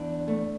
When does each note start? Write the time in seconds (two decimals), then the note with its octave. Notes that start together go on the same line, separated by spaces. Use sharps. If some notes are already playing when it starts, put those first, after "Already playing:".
Already playing: E2 D4
0.28 A3